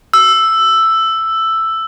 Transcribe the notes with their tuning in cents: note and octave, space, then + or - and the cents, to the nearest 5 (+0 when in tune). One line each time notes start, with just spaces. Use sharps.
E6 +5